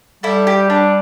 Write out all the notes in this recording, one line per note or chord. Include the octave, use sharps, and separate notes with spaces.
G3 E4 A4
G4
D4